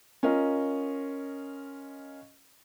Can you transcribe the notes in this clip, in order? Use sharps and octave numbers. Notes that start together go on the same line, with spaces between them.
C#4 F4 A#4 D#5